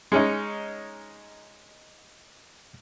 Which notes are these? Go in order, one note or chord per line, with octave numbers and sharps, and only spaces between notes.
G#3 C#4 D#4